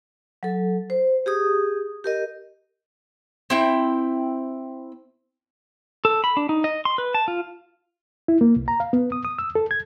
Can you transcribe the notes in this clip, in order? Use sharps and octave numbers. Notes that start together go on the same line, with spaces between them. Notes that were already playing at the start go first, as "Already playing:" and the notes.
F#3 A4
C5
G4 G#4 D#6
G4 A#4 D#5
C4 E4 G5
A4
B5
D4
D#4
D#5
C6
B4
A5
F4
E4
A#3
C2
A#5
F5
B3
D#6
D#6
E6
A4
G#6